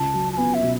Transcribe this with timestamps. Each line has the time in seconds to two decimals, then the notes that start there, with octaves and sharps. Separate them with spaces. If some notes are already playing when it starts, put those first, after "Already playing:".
Already playing: C#2 A5
0.14 F#3
0.33 A5
0.37 B3 G#5
0.54 E5
0.62 B2